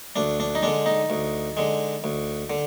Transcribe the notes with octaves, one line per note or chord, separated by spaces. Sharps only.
D2 D4
D4
D#4
D3 G#3 D4
D#4
D2
D3 G#3
D2
D3